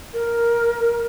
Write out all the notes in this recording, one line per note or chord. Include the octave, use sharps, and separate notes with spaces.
A#4